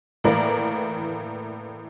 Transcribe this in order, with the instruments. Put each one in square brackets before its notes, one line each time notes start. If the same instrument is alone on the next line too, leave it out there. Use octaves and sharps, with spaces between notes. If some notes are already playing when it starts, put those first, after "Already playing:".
[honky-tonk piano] A2 E3 A#3 A#4 D5